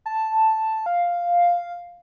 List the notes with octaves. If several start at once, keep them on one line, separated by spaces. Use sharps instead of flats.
A5
F5